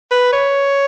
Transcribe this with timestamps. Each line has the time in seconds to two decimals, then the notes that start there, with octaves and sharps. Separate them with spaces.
0.11 B4
0.32 C#5